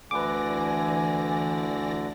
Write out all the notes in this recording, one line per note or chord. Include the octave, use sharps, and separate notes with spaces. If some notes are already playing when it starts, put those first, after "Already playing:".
D2 D3 E3 B4 D5 G#5 D6 A#6